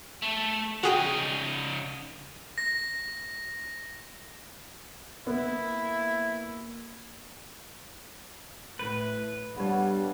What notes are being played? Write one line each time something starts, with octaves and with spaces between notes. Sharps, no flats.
A3
C#3 D#4 F#4 G#4 G5
A#6
A#3 B3 E4
A2 B4
G2 G3 B3 A4 C#5